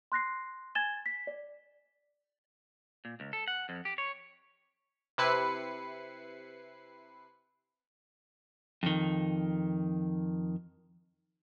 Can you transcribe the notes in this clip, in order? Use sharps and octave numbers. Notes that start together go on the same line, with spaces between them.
C6 F#6 A#6 C7
G#5 G#6 A6 E7 G7
B6
D5
A#2
C#2
A4
F#5
F2
G4
C#5
C3 E4 B4 C7 C#7
F2 D#3